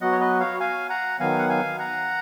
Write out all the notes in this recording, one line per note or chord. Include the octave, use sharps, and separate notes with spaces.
F#3 B3 F#4 D#5 F#5
C#5
B4 D#5
C#5 F5
F5 G#5
F#5 A#5
D#3 F#3 B3 F5 G#5
F#5
F5 G#5
F#5 A#5